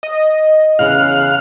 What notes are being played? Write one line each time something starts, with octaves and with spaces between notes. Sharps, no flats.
D#5
E2 C#3 F5 F#6